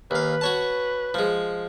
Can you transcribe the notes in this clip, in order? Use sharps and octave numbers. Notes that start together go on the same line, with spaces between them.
D#2 B4 F5
F#4 C#5 A5
F3 G#3